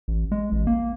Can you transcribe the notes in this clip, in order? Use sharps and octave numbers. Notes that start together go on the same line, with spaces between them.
A1
G#3
A1
A#3